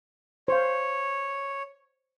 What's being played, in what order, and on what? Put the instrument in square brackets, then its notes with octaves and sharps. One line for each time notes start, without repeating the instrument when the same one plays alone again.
[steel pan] C5 F5 [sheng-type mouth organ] C#5